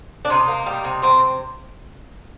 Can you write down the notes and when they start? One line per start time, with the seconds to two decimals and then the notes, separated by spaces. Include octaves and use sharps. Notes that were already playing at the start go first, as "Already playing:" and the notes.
0.25 D4
0.30 C3 D#4
0.48 A#3
0.66 G3
0.84 C3
1.02 C3 C4